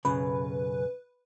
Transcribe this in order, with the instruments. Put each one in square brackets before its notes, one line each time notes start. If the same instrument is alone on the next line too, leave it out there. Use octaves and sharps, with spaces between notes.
[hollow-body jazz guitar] B1 F#2 C#3 [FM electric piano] B4